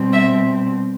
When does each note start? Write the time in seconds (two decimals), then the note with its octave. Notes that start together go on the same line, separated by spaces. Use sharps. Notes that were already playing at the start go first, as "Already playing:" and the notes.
Already playing: B2 G3 C4
0.13 E5